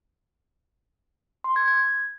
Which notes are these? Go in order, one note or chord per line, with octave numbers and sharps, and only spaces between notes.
C6
G#6
G#6